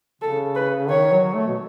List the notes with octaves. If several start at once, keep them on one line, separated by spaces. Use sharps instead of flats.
C#3 A4
B4
D#3 C#5
F#3
A3
B2